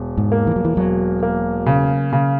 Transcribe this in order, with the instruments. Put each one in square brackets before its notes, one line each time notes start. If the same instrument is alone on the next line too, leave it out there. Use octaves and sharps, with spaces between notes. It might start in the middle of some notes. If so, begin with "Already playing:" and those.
Already playing: [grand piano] E1
[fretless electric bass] G#2
[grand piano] A#3
[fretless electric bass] E3
F#3
E3
[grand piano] E1 [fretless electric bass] F#3
[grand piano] A#3
C#3
C#3